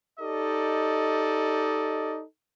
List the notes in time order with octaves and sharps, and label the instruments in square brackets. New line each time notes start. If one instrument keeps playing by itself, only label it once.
[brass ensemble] D#4 G4 A4 D5 D#5